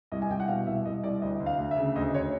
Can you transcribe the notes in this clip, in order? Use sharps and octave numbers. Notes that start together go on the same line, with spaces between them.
C2 D#5
G#5
C2 G5
F#5
B2 F5
C2 E5
C2 D#5
C2 D5
D2 D#5
D2
F5
D2
E5
C#3
D2 D#5
D2 C#5